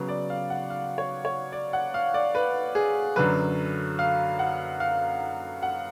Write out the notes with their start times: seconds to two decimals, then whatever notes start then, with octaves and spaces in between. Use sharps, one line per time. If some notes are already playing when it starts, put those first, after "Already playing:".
Already playing: C#3 F#3 B3
0.09 D5
0.30 F5
0.50 F#5
0.70 F5
0.98 C#5
1.25 C#5
1.52 D5
1.73 F#5
1.94 F5
2.14 D5
2.35 B4
2.75 G#4
3.16 F#2 D3 F#3 B4
3.99 F5
4.39 F#5
4.80 F5
5.63 F#5